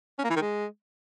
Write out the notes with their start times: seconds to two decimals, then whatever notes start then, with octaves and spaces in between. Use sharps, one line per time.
0.19 C#4
0.25 A#3
0.30 E3
0.36 D#3
0.42 G#3